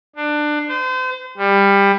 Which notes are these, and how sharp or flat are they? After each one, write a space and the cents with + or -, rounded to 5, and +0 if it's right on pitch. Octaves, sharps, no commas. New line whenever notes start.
D4 +20
C5 -35
G3 +20